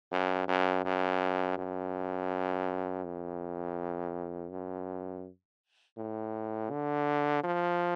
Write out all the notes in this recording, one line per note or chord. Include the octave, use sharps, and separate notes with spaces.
F#2
F#2
F#2
F#2
F2
F#2
A2
D3
F3